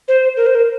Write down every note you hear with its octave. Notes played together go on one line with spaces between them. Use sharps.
C5
A#4
C5
A#4